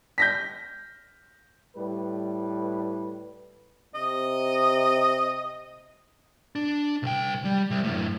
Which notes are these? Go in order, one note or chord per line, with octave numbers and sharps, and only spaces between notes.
G6 A#6 B6
A2 G3 B4
C3 D#5
D4
C2 G5
G3
C3 G3
F#2 A2